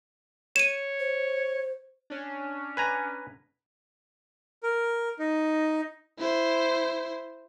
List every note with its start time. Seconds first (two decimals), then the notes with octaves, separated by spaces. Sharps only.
0.56 C#5 D#7 E7
1.00 C5
2.10 C#4 D4
2.77 B4 G#5 A#5
4.63 A#4
5.19 D#4
6.18 E4 C5